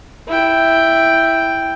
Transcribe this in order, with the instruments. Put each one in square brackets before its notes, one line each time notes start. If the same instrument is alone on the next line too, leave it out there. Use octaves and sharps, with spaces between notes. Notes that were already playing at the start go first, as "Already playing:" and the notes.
[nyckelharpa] E4 G5